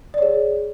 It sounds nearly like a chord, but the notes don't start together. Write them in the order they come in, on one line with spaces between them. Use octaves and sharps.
D5 C#5 G#4